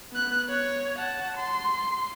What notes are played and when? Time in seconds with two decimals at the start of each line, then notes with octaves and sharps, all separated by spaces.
0.12 B3 F#6
0.50 C#5
0.98 F#5 A5
1.37 C6